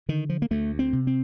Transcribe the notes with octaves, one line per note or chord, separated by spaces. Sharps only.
D3 D#3
F3
A#3
D2 A3
C4
C3
C4